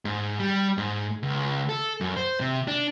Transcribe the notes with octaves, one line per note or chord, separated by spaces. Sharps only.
G#2
G3
G#2
C#2
A4
F#2
C5
C3
D4